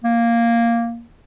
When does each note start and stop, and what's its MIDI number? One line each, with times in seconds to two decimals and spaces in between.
0.04 1.05 58